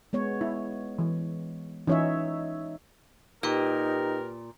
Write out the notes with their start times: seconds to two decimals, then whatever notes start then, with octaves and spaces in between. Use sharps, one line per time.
0.13 G#3 B3 C#5
0.41 E4
0.99 E3
1.87 E3 C#4 D#4 F4 C#5 E5
3.43 A#2 D#4 G4 A#4 B4 G5